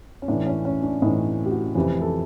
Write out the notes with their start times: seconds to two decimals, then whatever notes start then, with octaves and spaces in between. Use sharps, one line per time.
0.22 C#4
0.28 A2 E3 D4
0.47 C#4
0.65 C#4
0.83 D4
1.02 A2 E3 D#4
1.46 G4
1.51 F#4
1.75 F2 C3 E3
2.01 A4